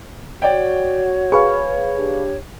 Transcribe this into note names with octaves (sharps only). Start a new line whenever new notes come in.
F#4 C#5 D5 G5
G#4 B4 F5 C#6
D4 G4